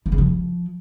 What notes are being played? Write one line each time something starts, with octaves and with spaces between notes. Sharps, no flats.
E3
C#3
F3